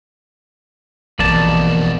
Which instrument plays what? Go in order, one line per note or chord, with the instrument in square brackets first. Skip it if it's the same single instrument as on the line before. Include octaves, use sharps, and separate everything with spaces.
[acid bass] A#1 [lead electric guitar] F2 B2 [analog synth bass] E3 [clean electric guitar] A#3 D5 A5